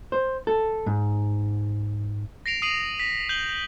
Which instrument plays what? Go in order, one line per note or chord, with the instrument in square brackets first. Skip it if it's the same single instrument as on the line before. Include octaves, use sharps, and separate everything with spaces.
[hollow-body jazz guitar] C5
A4
G#2
[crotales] A#6 C7 D7 F7
D#6 C7 D#7 F7 F#7
B6
G6 F#7 G7